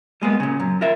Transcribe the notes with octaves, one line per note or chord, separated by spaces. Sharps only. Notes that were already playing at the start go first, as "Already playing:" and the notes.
G3 G#3 A#3 B3
A#2 C#3
F#2
F4 A#4 E5